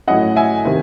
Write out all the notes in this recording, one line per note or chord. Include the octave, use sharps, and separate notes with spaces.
A2 F#3 C#4 E4 D#5 F#5
E5 G#5
C3 D#3